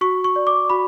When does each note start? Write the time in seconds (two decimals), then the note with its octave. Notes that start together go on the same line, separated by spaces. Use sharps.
0.01 F#4 C#6
0.24 C#6
0.36 D5
0.47 D6
0.70 F#4 B5